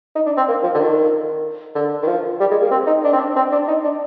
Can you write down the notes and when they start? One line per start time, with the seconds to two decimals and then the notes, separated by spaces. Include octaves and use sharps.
0.15 D#4
0.26 D4
0.37 C4
0.48 A#3
0.63 F3
0.75 D3
0.80 D#3
1.75 D3
2.03 D#3
2.07 F3
2.40 G3
2.51 G#3
2.62 A#3
2.71 C4
2.87 D#4
3.04 D4
3.13 C4
3.20 D4
3.36 C4
3.52 D4
3.68 D#4
3.84 D4